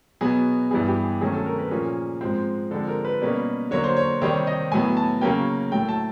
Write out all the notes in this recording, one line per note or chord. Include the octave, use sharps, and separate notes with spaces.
B2 F#3 B3 G#4
G2 E3 G3 B3 G#4
G4
G#4
C3 D#3 F#3 A3 C#4 G#4
A4
A#4
B4
A#2 F3 A#3 C#4 G#4
G#2 F3 G#3 C4
D3 F3 G#3 C4 A4
A#4
B4
B2 G3 A#3 C#4
D3 F#3 A#3 C#5
C5
C#5
C3 D#3 G3 C4 C#5
D#5
A2 F#3 B3 G#5
A5
C#3 F#3 A#3 C#4 G5
A2 F#3 A3 G5
A5